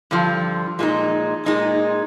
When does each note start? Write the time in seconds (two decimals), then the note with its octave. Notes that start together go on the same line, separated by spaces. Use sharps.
0.11 G2 D3 F3
0.79 A#2 G#3 D#4
1.46 A#2 G#3 D#4